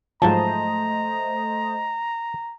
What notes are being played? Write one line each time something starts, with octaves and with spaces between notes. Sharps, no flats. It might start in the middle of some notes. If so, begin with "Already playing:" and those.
G#2 F3 F#3 A3 C5 D#5 A5 A#5